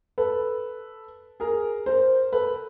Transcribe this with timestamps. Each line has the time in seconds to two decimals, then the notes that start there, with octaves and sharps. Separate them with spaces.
0.18 A4 B4
1.40 G#4 A#4
1.86 A#4 C5
2.32 A4 B4